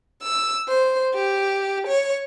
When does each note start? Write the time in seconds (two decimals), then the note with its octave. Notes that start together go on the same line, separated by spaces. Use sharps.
0.23 E6
0.68 C5
1.14 G4
1.88 C#5